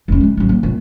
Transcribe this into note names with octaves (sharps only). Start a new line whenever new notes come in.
F1 C#4
G#3 E4
A1 F#3
A#3
C2 A#2